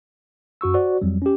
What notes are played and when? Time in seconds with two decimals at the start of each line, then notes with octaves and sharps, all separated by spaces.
0.61 F#2 F#4 C#6 E6
0.74 F#4 C5 D5
1.02 F2 F#3 G3
1.22 C#4 G4